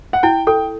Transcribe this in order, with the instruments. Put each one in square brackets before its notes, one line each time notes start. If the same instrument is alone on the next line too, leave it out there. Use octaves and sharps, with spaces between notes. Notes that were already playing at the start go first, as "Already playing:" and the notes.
[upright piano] F#5
[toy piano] E4 [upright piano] G5
[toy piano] A4 [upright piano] G5